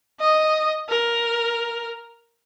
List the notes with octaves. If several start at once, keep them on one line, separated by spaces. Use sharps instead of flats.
D#5
A#4